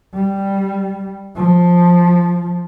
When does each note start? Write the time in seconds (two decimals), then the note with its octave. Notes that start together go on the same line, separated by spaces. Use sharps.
0.14 G3
1.36 F3